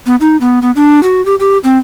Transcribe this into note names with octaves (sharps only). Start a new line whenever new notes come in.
B3
D#4
B3
B3
D4
F#4
G4
G4
C4